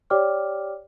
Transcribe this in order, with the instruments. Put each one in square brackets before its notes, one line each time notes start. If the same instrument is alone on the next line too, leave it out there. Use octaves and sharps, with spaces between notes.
[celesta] G4 C#5 D5 G5 D6 F6